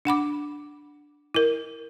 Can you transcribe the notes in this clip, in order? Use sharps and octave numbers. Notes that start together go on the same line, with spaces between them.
D4 F#5 B5 D6
E4 A#4